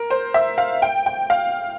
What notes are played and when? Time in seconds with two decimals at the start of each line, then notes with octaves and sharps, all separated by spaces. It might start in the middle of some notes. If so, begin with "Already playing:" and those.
Already playing: A#4
0.10 C5
0.34 E5
0.58 F5
0.82 G5
1.06 G5
1.30 F5